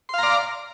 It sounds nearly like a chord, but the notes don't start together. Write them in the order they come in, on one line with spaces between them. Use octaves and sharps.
C6 F5 A#5 D5